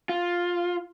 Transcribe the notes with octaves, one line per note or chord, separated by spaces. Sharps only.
F4